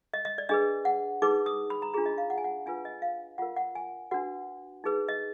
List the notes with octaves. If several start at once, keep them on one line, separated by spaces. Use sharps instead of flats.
D#5
D#5
D5
D4 G#4 B4 D#5
F#5
D#4 G#4 B4 D6
D#6
B5
A#5
D4 F4 G#4 A#5
D#5
F5
F#5
G#5
F#5
D4 F4 B4 G#5
D#5
F5
F4 A#4 F#5
F#5
G#5
D4 F#4 B4 F#5
D#4 G#4 B4
D#5